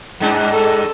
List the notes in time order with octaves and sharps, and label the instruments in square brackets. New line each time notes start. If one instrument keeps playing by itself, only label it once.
[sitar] G2 G#3 D4
[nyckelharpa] A4